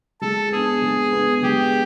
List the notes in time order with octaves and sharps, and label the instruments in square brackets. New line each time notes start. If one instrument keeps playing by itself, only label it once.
[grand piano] G#3 [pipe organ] A4
[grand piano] B3 D4 [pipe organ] G#4
[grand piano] G#3
B3 D4
[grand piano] G#3 [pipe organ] G4